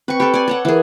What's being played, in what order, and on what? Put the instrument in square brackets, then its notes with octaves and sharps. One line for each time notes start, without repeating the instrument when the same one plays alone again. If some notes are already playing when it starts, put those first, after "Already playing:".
[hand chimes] C4 G5 C#7 [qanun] B4 C#6
[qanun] G4 A4 [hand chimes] B5 F#6
[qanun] D5 G#5
A4 C#5 F#5
[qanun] E3 G#4 [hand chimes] A#4 B4